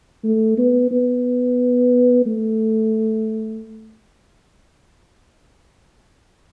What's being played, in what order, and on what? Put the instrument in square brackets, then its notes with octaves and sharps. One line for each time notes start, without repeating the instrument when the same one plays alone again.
[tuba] A3
B3
B3
A3